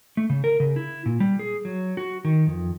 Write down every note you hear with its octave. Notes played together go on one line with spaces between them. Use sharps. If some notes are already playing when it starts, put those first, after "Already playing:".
A3
C#3
A#4
C#3
E4
A#2
G3
G#4
F#3
F#4
D#3
F2